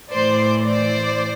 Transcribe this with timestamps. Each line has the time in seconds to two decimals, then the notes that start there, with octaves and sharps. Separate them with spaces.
0.11 A2 E3 C5 D5
0.65 C5 D5